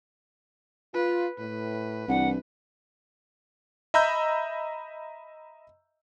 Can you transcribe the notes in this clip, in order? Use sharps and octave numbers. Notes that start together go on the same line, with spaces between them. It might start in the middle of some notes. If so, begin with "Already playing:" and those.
F4 B4
A2 B4
C2 E3 D4 F#5
D#5 E5 A#5 B5 E6 G6